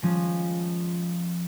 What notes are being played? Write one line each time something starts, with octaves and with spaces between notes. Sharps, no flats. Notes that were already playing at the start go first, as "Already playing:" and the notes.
F3 G#3 C#4